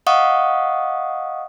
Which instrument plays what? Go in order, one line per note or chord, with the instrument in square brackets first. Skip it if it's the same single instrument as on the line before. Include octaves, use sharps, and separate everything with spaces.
[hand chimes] D#5 F5 F#5 C#6 D#6